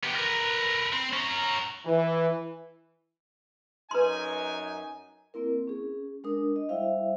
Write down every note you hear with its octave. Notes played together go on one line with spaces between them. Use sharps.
B3 G4
A#4 B4
C4
C#4 A#5
E3
F#2 D#4 B4 G#5 C6
A#3 C4 E4 A#4
C#4 G#4
G#3 D4 A#4 D#6
D#5
G3 E4 C5 E5 F5